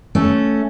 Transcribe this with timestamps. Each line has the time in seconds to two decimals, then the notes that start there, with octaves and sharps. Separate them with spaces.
0.15 A3 C#4